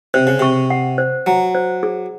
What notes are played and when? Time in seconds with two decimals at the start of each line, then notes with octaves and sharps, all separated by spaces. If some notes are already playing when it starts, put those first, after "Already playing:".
0.14 C3 C5
0.27 C#3
0.39 C3 C#6
0.70 F#5
0.98 C5
1.26 F#3 A#5
1.55 C5
1.83 G#4